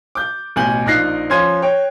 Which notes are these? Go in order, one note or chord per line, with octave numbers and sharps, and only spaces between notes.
D6 G6
A1 B2 G#5 G6 F#7
A#1 D#4 F4 F#6 A#6 C7
F3 C#4 C6 G#6 D#7
C#5 G5